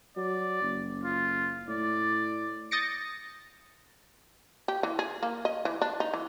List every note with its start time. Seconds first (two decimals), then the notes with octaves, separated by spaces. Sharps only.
0.17 F#3 D5
0.62 F#1
1.03 F4
1.68 A2 D5
2.71 D#6 G6 A6 A#6 C#7 D7
4.68 G4
4.83 E3
4.99 G#4
5.23 A#3
5.45 D#5
5.65 E3
5.82 D4
6.00 D#4
6.14 E3